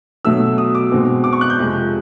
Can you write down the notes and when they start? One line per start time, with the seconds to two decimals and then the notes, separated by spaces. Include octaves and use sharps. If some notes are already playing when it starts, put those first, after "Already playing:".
0.25 B2 F#3 A3 E6
0.58 D#6
0.75 D6
0.91 B2 G#3 C4
1.24 D6
1.33 C#6
1.41 F#6
1.50 G6
1.58 F2 C3 F3 G#3